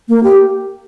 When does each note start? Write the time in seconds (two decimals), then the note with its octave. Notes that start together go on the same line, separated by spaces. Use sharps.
0.09 A#3
0.23 G4